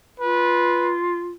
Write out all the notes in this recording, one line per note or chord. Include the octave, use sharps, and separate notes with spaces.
F4 B4